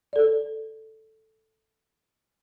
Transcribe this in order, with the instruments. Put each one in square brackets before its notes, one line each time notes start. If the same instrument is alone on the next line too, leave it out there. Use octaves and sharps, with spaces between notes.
[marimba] A4 D5